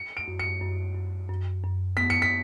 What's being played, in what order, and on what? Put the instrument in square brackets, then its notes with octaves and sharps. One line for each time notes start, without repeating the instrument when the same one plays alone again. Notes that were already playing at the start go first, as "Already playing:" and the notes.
Already playing: [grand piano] C#7
D7
[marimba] F#2
[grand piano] C#7
[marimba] F#2
F#2
F#2
F#2
[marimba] B3 [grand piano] B6
[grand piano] C#7
B6